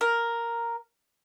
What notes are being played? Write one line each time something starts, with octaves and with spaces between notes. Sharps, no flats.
A#4